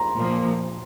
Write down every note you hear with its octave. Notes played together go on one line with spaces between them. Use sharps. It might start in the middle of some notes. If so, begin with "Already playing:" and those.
Already playing: A#5 C6
A#2 F3 A#3